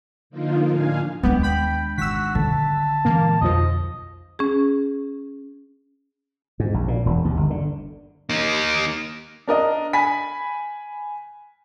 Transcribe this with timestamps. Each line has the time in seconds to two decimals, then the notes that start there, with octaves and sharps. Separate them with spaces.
0.30 D3 F3 A#3 D#4 F4
0.69 A2 D4 F5 G#5
1.23 D#2 G#3 B3 D4 G4
1.43 G5 B5
1.98 G#1 G#2 D#3 F#4 E6 B6
2.35 D3 A5
3.05 A#2 E3 G#3 A#3
3.41 B1 F2 F3 D#5
4.39 C#4 G#4
6.60 G#2
6.74 A#1
6.88 A#2
7.06 E1
7.25 D#2
7.37 G1
7.50 D3
8.29 A#3 D#4
9.48 D4 A#4 D#5
9.93 G#5 B5 B6